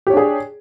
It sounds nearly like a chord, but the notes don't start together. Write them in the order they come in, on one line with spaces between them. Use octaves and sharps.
G4 C#5 D4 G#4